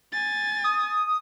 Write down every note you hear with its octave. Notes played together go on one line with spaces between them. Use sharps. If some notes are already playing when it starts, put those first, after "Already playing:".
G#5 A6
D#6